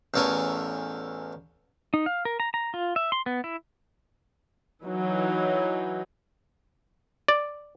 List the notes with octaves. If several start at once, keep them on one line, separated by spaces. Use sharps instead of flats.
A1 E2 A4 A#4 C#5 G#5
D#4
F5
A#4
A#5
A#5
F4
E5
C6
B3
E4
E3 F#3 D#4
D5